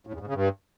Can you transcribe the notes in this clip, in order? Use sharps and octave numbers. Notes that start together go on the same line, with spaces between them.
A2
E2
G#2
C#3
G2